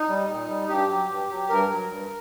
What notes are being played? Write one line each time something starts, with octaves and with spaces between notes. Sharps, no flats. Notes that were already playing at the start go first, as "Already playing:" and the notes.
Already playing: D#4
G3
A#2
G3
G2 G4
F#3
G2
F#3
G2 A#4
F#3
G2